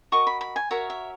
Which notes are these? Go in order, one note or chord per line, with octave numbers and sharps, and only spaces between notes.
F#4 A#4 D#5 C#6
B5
B5
G#5
F#4 A#4 C#5 E5
E5